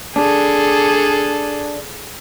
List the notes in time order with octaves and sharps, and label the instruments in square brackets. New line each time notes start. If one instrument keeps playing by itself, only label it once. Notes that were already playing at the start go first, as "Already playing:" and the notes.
[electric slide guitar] D4 [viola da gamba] G#4 A4